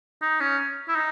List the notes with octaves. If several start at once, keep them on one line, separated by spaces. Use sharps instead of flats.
D#4
C#4
E4
D#4